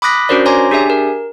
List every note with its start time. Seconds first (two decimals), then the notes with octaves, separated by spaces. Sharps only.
0.02 B5 D6 D#6 F#6 A#6 B6
0.29 C#4 D4 F#4 A#4 C5 D5
0.46 C#5 G#5 A#5 C6 D6 A#6
0.71 D4 G4 G#4 E5 G#5
0.90 A#4